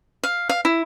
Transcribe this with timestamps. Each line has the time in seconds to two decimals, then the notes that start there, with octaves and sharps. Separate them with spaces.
0.23 F5
0.49 F5
0.65 E4